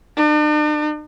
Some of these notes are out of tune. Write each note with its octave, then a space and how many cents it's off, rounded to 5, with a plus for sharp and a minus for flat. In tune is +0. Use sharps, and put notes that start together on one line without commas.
D4 +45